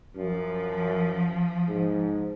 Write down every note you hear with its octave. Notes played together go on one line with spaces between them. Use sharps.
F#2 F3
G#2